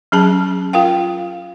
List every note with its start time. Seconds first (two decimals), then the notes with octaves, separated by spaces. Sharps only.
0.12 F#3 C#4 G#4 A5
0.73 F4 A#4 F5 G5